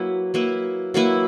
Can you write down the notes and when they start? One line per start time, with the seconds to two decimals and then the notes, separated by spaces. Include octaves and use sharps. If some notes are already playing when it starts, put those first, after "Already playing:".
Already playing: F#3 A#3 E4 B4
0.34 F#3 A#3 E4 B4
0.94 F#3 A#3 E4 B4